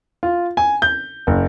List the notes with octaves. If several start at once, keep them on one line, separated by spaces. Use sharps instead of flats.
F4
G#5
G6
F#1